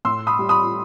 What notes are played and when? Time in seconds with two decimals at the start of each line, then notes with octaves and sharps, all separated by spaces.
0.05 A2 C6 E6
0.27 B5 D#6
0.39 G3
0.49 B5 D#6